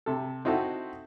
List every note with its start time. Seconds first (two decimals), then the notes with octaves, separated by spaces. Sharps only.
0.06 C3 A4
0.45 C4 D#4 E4 F#4 A4